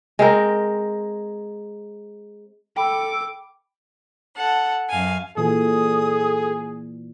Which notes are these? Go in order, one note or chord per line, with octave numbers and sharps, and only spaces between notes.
G#3 C4 A#4
A4 G5 B5 D6
A4 F#5
F#2 F5 G#5
A#2 E3 G#4 A4 D#6